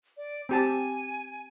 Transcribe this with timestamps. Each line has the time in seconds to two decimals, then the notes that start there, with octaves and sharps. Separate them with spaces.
0.17 D5
0.49 C4 G4 G#5 A5